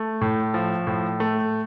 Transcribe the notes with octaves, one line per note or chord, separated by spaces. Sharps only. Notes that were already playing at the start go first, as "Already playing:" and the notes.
Already playing: A3
A2
F3
A2
A3